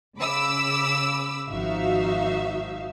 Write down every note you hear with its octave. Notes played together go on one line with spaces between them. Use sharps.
C#3 B5 D6 E6
G#1 F3 D#4 F#4 E5 F5